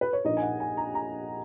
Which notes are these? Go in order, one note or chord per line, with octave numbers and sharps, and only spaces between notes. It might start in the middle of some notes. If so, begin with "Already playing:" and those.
B4
C#5
A#1 A#2 A#3 D#4 D#5
G#5
F#5
G#5
A#5
A#5